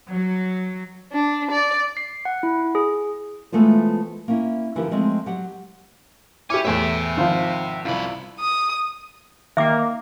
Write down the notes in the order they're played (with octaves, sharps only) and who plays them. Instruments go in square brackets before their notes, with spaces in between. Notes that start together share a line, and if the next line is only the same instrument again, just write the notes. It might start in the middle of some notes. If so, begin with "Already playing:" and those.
[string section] F#3
[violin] D4
D5
[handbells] C7
F#5
E4
G#4
[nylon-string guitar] E3 G#3 A3 B3 F4 C5
A#3 C#4 E4
D3 E3 F3 C#4 G4 A#4
F3 G#3 A3 C4 D#5
F#3 G4 F#5
[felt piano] E4 G4 [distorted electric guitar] C#5 G#5 [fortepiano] D6
[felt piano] E2 A2 [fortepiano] C#5 [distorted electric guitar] E5 G5
[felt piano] G#1 F3 [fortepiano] F4 C5 F5
[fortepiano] C2 E4 F4 [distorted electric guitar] F#2 B5
[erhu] D#6
[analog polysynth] D#3 A#3 [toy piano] E5 D6